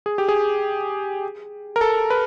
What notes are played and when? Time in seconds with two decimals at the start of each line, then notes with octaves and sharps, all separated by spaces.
0.06 G#4
0.18 G4
0.29 G#4
1.76 A#4
1.81 A4
2.10 B4